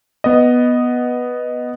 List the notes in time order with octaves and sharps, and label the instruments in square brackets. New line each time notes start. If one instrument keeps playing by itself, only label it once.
[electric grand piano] B3 D#5